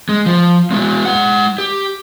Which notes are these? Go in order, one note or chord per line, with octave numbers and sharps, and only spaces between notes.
G#3
F3
G#3 B3 F#4
G#3 F#5
G4